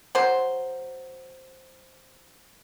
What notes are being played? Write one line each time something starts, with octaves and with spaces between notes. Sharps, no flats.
F#3 C5